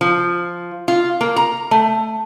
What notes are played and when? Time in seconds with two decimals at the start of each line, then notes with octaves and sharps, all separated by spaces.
0.01 F3
0.88 F4
1.21 A#3
1.36 A#5
1.71 A3